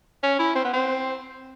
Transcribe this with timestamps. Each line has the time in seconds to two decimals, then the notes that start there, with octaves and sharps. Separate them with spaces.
0.23 C#4
0.39 E4
0.55 C4
0.65 B3
0.73 C4